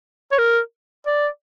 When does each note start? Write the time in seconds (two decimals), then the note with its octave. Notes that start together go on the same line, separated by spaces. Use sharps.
0.32 C#5
0.39 A#4
1.07 D5